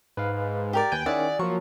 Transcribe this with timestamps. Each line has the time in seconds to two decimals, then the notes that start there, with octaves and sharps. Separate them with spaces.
0.17 G#2 B4 F5
0.73 G4 A#4 D5
0.92 D#2 B4 G5 G#5
1.06 D#3 C#4 E4 G#4 D5 F#5
1.39 F3 F#3 A#3 C#6